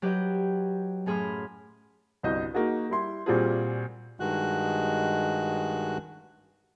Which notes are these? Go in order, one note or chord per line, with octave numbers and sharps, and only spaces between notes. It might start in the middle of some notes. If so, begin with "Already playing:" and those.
F#3 G4 B4 D#5 G6
F#2 A2 G#4 B5 C6 F6
G1 C2 F#4 D#5 G6
A#3 D#4 F#4 G#4
G3 E4 C6
A#2 G3 C4 F4 F#4 G#4
G2 D#3 G#3 F#4 F#6